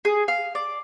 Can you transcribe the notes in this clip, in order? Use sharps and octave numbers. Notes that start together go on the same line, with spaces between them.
G#4
F5
D5